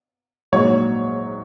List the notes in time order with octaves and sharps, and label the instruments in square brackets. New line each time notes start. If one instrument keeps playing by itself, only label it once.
[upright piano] A#1 G#2 F#3 C#5